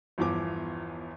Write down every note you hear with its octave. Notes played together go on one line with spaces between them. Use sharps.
G1 E2 E3 F3 D6